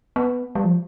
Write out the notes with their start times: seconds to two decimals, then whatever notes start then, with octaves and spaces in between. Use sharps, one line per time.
0.16 B3
0.55 G3
0.64 F3